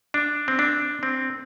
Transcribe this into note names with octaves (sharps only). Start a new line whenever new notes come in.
D4
C4
D4
C4